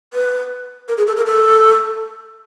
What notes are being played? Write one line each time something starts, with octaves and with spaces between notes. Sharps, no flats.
B4
A#4
G#4
A4
A#4
A4